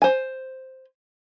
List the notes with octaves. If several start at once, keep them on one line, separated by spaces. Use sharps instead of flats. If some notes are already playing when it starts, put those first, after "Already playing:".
C5 G#5